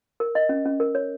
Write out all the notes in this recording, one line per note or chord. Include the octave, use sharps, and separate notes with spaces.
A#4
D#5
C#4
C#4
A#4
C#5